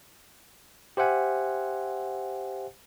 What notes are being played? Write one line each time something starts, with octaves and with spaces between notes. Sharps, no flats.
G4 C5 E5 F#5 G#5